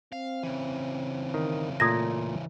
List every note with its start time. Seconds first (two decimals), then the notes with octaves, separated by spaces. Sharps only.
0.13 C4 F5
0.43 C#3 E3
1.34 D#3
1.80 A#2 A3 D#6 G#6 A#6